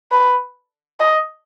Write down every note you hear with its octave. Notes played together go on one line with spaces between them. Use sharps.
B4
D#5